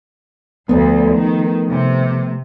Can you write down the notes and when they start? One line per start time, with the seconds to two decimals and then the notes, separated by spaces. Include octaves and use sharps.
0.69 D2 F3 A3 B3
1.15 D#3
1.67 C3